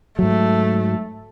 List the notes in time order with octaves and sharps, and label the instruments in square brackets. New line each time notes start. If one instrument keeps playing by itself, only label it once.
[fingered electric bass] G#2 F#3 [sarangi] A3